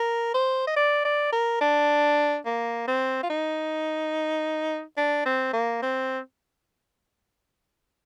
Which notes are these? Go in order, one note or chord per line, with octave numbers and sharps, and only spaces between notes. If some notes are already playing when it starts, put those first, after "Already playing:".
Already playing: A#4
C5
D#5
D5
D5
A#4
D4
A#3
C4
F4
D#4
D4
C4
A#3
C4